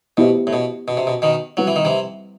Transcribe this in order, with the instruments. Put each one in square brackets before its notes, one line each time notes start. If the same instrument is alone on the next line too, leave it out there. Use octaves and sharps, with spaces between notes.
[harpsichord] B2 [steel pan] B3 E4 G4 C5 E5
[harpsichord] A2
B2
B2
C3
B2
B2 D#3
[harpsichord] F#3 [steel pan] G3 C4 E4 B4 F#5
[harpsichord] E3
D#3
C3 E3